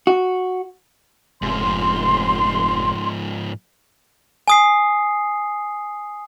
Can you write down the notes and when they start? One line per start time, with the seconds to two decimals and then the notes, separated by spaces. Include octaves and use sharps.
0.07 F#4
1.42 F1 G#2 F3 C6
4.48 G#5 D#6 C7